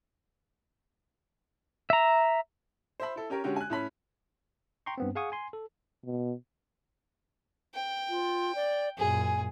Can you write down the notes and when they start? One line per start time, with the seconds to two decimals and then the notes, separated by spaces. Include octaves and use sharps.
1.90 E5 A#5
3.00 C5 E5 B5
3.16 E4 A4
3.30 C#4 G4 A#4 C#5
3.44 D3 G#3 C#4 F#4 G4
3.56 G#5 F#6
3.70 A2 C#4 B5 B6
4.86 G5 A#5 C6 C#6
4.98 G2 B3 C4
5.15 G#4 F5 F#5 G#5 C#6 D#6
5.32 G#5 C6
5.53 A4
6.06 B2
7.75 G5
8.09 F4
8.55 D5
8.98 F#2 A#2 G#4 G#5